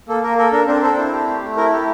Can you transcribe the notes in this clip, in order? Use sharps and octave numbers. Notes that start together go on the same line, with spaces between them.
A#3 A4
A#3 A#4
A4 A#4
D4 A#4
C4 D4 C5
C4 A4 C5
E4
G4
A3
A3
E4 A#4
G4 A4